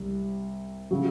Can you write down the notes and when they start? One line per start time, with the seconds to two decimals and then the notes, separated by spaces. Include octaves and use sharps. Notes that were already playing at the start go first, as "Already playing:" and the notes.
Already playing: C2 C3
0.91 C#3 F#3